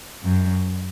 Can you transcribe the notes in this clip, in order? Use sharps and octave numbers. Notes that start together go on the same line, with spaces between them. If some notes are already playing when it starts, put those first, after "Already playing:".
F#2